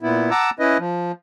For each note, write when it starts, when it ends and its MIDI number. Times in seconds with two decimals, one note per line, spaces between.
0.03 0.30 46
0.03 0.30 59
0.03 0.30 64
0.31 0.50 78
0.31 0.50 81
0.31 0.50 82
0.31 0.50 86
0.31 0.50 88
0.59 0.78 61
0.59 0.78 64
0.59 0.78 71
0.59 0.78 75
0.79 1.12 53